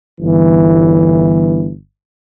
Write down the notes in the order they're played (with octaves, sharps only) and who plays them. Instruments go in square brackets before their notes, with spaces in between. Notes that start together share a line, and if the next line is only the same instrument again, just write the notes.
[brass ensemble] G1 E3